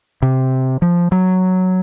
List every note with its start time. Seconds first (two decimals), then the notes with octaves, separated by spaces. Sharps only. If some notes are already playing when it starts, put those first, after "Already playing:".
0.22 C3
0.82 F3
1.12 F#3